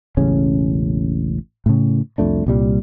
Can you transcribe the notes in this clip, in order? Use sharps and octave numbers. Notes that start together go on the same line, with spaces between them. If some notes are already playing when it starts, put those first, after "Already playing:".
E1 A1 C#3 C#4
A2 C#3
C2 F2 A3 D4
C2 A#2 G3